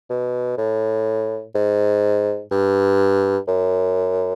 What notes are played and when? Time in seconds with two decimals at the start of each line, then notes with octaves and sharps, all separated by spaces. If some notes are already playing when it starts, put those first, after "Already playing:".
0.10 B2
0.58 A2
1.55 G#2
2.51 G2
3.48 F#2